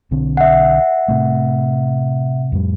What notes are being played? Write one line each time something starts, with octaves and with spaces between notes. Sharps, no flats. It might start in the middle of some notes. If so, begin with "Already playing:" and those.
B1 D3 C4
E5 F#5
A2 C3 A3
F2 A2 G3